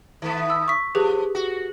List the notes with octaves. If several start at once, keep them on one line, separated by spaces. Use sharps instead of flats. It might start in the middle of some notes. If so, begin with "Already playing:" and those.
D#3 A3 B3
E6
C#6 B6
F3 G4 G#4 B4
F#4